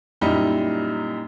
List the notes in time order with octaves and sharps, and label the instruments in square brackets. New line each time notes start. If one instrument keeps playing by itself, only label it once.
[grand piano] F#2 A#2 G3 D#4 E4 B5